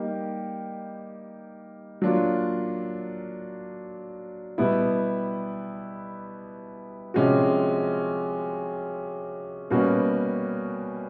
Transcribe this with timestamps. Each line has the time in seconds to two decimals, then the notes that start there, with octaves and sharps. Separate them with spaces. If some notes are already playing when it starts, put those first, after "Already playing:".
Already playing: G3 A#3 D#4 G4
2.02 F#3 A#3 D4 F4
4.58 B2 G3 B3 E4
7.14 C3 F3 G#3 C#4 F#4
9.70 B2 G3 A#3 C#4 F#4